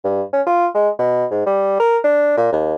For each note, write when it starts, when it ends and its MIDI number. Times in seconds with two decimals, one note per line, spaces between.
0.04 0.23 43
0.33 0.42 61
0.47 0.67 65
0.74 0.89 56
0.99 1.26 47
1.31 1.43 44
1.46 1.79 55
1.80 1.98 70
2.04 2.37 62
2.37 2.51 46
2.53 2.75 39